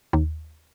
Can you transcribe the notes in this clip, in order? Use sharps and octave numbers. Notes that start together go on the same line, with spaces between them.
D#2